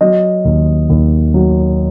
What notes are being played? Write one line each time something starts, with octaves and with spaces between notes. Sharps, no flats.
F#3 D#5
D#2
D#2
F#3